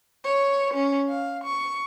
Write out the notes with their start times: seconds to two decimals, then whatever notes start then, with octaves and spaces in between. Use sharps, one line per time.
0.25 C#5
0.74 C#4
1.09 F5
1.44 C#6